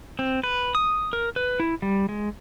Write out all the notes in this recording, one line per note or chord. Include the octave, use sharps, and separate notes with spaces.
C4
B4
D#6
A#4
B4
E4
G3
G#3